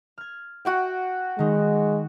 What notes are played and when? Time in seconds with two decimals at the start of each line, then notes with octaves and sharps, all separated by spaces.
0.18 F6 G#6
0.65 F#4 F#5 G5
1.39 D#3 G#3 D#4